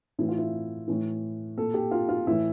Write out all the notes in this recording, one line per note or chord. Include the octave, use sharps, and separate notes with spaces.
A2 E3 E4
F4
E4
A2 E3
A#2 A4
G4
F4
F4
A2 E3 E4